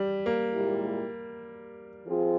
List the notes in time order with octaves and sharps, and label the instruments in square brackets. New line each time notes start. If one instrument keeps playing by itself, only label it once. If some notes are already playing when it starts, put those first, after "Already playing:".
Already playing: [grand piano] G3
A#3
[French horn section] A#2 G#3 E4 G4
F3 C4 F4 G#4